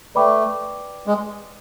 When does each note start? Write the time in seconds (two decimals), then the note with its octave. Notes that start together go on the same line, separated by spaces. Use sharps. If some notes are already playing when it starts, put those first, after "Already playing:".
0.15 A3 B4 D5 G5 B5 D6
1.07 G#3